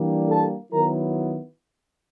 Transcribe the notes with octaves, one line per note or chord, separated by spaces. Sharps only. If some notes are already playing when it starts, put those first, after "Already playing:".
Already playing: E3 G3 A#3 D4
A4 A5
D#3 F#3 B3 E4 A#4 A#5